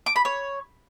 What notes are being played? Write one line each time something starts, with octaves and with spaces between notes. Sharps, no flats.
D6
B5
C#5